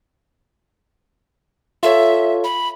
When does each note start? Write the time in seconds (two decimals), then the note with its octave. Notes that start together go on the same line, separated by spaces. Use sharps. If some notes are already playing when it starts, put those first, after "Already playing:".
1.83 F4 A4 C#5 E5
2.44 B5